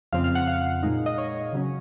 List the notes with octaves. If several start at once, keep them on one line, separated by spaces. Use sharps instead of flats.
F2 C#3 F3 C4 F5
F5
F#5
F5
A#2 G#3 D#4
D#5
C#5
C#3 F#3 C#4